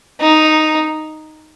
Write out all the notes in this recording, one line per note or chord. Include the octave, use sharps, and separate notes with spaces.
D#4